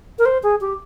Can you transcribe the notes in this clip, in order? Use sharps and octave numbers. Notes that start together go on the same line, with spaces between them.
A#4
C5
G#4
G4